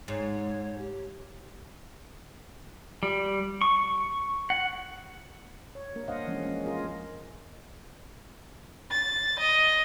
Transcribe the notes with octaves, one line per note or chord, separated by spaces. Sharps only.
G#2 C#5
G4
G3
C#6
F#5
C#5
G3 A#3 D4 A#4
D4 C5 D#5 F5 F#5
E3 F3 G#3 C#4
G#3 C#4
F4 G#4 A#4 D#5
A6
D#5